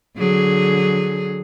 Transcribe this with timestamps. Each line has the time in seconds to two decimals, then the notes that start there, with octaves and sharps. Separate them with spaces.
0.17 D3 F#3 G#4